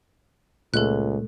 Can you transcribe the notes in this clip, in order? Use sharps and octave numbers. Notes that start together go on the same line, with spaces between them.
C#2 A#2 G#3 A3 A4 F#6